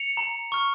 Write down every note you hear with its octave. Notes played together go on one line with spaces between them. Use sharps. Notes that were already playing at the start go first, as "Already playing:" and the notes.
Already playing: C#7 F7
A#5
C#6 F6